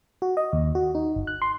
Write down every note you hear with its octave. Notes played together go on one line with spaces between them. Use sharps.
F#4
D#5
D#2
F#4
D#4
G1
F#6
C6